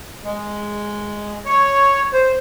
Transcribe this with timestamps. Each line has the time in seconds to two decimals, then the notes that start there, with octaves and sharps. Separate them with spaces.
0.25 G#3
1.46 C#5
2.13 C5